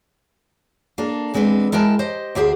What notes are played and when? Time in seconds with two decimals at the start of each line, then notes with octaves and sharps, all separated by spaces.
0.98 A#3 D4 A4
1.34 E2 G#3 C4 D4 B4
1.72 G#3 E4 A#4 G5 A5
1.99 G4 C5 D#5
2.35 D2 G4 G#4 C5 G5